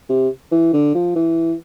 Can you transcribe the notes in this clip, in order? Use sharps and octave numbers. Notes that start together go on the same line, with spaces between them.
C3
E3
D3
F3
E3